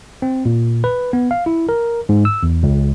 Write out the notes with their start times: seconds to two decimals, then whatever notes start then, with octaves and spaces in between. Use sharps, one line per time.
0.22 C4
0.45 A#2
0.84 B4
1.13 B3
1.31 F5
1.46 E4
1.69 A#4
2.09 G#2
2.25 E6
2.43 E2
2.63 C#2